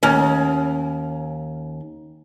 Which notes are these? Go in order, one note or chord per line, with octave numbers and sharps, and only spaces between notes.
D#2 C#4